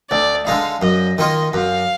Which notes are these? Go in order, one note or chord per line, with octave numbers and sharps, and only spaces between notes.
D2 D5
D3 G#3 D#4 F5
F#2 D#5
D#3 A#3 F4 D#5
F#2 F5